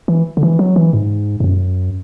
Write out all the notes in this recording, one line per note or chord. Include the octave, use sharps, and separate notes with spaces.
E3
D3
E3
F#3
E3
G#2
G#2
F#2